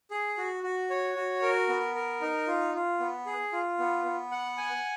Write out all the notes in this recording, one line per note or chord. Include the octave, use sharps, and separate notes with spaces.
G#4
F#4
F#4
C#5
F#4
A#4
B3
A#4
D#4
F4
F4
B3
G#4
F4
B3
B3
F#5
G#5